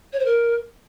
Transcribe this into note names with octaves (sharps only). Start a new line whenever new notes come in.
C#5
C5
A#4